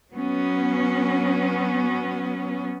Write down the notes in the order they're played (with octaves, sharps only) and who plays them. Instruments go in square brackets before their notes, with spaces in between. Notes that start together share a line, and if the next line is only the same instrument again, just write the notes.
[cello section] F#3 B3 C#4